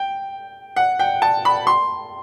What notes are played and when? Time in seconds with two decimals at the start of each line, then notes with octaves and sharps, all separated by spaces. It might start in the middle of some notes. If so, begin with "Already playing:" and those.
Already playing: G5
0.76 F#5
0.99 G5
1.22 A5
1.45 B5
1.67 C6